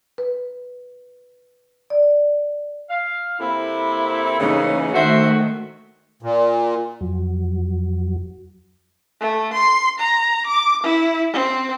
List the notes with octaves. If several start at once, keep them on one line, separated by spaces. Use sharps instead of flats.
B4
D5
F5
C3 A#3 C4 E4 A4
C#3 E3 A#3 C#4 D#4
D#3 A3 F#4 A4 C5 E5
A#2
F2 F#3
A3
C6
A#5
D6
E4
C4